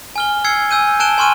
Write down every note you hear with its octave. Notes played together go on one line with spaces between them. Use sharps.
G#5 F6 G7
E6 G#6 C7 C#7
G#5 E6 G6 D#7
G#5 A5 F#6 D7 E7 G7
G#5 C6 C#6 F6 D#7